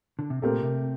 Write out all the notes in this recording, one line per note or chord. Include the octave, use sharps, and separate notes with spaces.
D3
C3
A#2 A3 C4 G4 A#4
C3